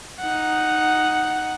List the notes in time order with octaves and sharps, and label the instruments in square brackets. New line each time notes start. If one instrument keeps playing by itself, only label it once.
[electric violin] D#4 F#5